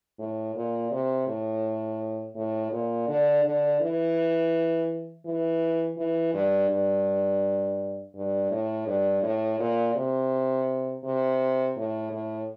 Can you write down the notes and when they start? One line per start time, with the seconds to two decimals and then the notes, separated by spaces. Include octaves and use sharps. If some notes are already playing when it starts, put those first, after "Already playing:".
0.19 A2
0.56 A#2
0.91 C3
1.27 A2
2.36 A2
2.72 A#2
3.08 D3
3.45 D3
3.81 E3
5.26 E3
5.98 E3
6.34 G2
6.70 G2
8.15 G2
8.51 A2
8.87 G2
9.23 A2
9.60 A#2
9.96 C3
11.04 C3
11.77 A2
12.12 A2